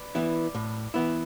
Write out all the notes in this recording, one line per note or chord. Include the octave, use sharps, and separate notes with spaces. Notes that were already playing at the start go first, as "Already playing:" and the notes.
Already playing: B4 D5
E3 B3 E4
A2
E3 B3 E4